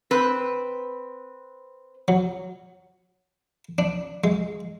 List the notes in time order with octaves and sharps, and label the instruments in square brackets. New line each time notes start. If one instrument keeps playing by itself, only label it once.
[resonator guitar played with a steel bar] C4 B4
[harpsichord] F#3
D4
G#3